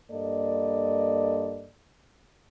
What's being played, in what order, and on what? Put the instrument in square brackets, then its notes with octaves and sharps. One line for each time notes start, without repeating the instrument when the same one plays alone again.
[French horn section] G2 A#3 A4 D5 D#5